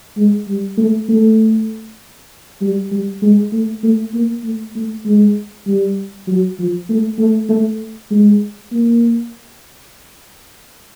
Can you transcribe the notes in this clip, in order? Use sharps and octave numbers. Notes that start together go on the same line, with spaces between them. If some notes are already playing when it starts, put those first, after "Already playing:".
G#3
G3
A3
A3
G3
G3
G#3
A3
A3
A#3
A3
A3
G#3
G3
F#3
F3
A3
A3
A3
G#3
A#3